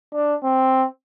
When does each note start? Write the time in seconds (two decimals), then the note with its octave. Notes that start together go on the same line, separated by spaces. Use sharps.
0.13 D4
0.44 C4